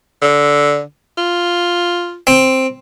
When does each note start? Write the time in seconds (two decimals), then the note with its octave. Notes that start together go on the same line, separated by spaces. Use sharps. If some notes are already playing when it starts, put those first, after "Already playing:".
0.22 D3
1.17 F4
2.27 C4